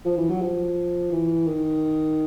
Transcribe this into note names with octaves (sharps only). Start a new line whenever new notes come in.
F3
E3
F#3
F3
E3
D#3